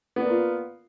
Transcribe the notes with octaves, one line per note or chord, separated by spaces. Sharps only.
A#3 B3 F4 D5